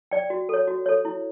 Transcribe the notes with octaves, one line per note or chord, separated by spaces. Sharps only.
D5 G5
F#4
A4 C#5
F#4
A4 C#5
E4